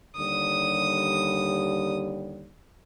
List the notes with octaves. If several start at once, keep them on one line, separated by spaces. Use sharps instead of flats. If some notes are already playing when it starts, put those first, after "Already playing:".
D#2 D3 G3 D#6